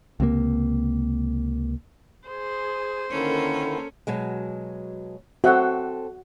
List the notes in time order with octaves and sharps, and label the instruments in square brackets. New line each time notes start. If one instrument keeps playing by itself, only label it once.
[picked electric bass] C#2 C3 E3 A#3
[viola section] G#4 [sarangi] C5
[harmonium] D3 D#3 E4 [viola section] A#3 A4 A#4 [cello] C#4
[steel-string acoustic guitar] B2 F#3 G#3
[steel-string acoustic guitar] C4 A4 [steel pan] F#4 E5 F#5